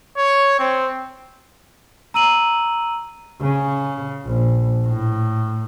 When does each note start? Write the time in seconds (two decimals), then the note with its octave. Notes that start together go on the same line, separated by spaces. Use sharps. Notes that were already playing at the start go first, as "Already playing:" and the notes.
0.18 C#5
0.59 C4
2.14 A#5 E6 D#7 F#7
3.41 C#3
4.25 A#1
4.87 A2